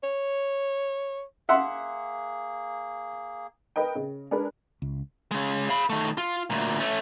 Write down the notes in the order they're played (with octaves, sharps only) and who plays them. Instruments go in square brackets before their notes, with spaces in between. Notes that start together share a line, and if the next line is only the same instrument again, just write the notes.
[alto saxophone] C#5
[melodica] A#3 G#4 [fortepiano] E5 F#5 C6
[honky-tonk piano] A#4 B4 D#5 G5
C#3
G#3 D4 G#4 A#4 B4
[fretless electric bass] C#2
[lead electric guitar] C#3 G#3
F5 B5
D#3 A3
F4
D2 A#2
A3 C#4